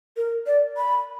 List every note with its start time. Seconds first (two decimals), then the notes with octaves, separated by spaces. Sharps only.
0.17 A#4
0.46 D5
0.77 B5